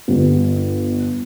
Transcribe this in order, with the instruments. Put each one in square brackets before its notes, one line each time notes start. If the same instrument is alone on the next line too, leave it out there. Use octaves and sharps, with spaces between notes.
[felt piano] G1